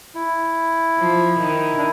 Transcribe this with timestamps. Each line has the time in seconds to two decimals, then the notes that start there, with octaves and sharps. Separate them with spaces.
0.15 E4
0.98 F3
1.39 D#3
1.77 D4